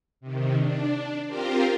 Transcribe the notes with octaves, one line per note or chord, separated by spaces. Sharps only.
C3 D#3
D4
C4 F4 G4 A#4 C5